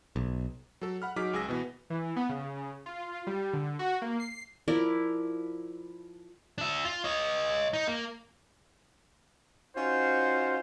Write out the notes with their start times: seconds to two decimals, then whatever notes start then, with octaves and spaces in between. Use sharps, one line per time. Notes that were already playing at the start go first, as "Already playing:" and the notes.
0.16 B1
0.81 F#3 A4
1.02 F#5 B5 F6
1.16 F#3 D#4 G#4 D6 F6 B6
1.33 C#2 G#4 E6 A#6
1.49 B2 E3 B3
1.90 E3
2.16 B3
2.29 C#3
2.86 F4
3.27 G3
3.53 D3
3.79 F#4
4.02 A#3
4.20 C7
4.68 F3 E4 A#4 D5
6.58 D4 E5
6.85 F4
7.04 C#5 D#5
7.74 D#4
7.87 A#3
9.76 C#4 D#4 F4 F#4 C5